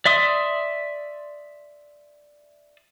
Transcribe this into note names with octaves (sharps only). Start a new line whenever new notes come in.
D5 E5 C6 D#6